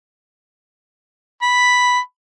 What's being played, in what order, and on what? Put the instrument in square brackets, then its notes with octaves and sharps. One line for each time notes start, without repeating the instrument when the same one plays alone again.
[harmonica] B5